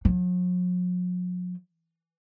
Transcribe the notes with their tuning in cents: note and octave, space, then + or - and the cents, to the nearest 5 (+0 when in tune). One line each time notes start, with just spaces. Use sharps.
F#3 -45